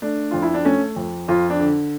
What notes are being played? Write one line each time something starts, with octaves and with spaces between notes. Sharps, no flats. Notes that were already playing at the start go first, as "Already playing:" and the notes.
A3 D4
F2 F4
E4
D4
A3 C#4
F2
F2 F4
D4
D3